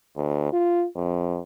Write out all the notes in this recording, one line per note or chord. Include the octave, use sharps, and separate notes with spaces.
D2
F4
F2